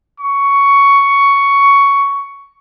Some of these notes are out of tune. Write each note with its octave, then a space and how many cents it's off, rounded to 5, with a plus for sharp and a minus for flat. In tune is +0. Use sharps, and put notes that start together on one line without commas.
C#6 +10